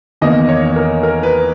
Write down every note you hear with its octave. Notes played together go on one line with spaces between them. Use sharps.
E2 D#3 A#3 D#5
C#5
A#4
A#4
B4